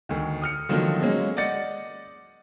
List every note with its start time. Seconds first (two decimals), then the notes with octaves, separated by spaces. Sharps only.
0.09 D2 D#3
0.42 D#6 F6 C#7
0.69 D3 D#3 F3 F#3 A#3 A#4
1.01 F#3 G#3 A#3 C#4
1.37 D5 D#5 F#5 A6 C#7